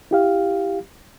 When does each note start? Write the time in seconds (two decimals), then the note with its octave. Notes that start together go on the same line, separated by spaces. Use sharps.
0.11 E4 G4 F5